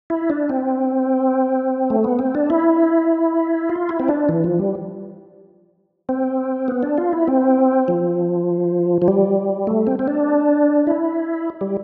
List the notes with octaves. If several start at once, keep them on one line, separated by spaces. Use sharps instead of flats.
E4
D4
C4
A3
B3
C4
D4
E4
F4
E4
C4
D4
E3
F3
G3
C4
B3
D4
F4
E4
C4
F3
F3
G3
A3
C4
C4
D4
E4
G3